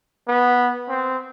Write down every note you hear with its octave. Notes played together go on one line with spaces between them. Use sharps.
B3
C4